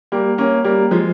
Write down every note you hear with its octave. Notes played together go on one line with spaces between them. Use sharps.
G3 A#3
A#3 C#4
G3 A#3
F3 G#3